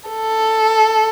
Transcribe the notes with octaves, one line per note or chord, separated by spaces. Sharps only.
A4